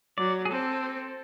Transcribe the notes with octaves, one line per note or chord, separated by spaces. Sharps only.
F#3 D5
G#4
C4 A4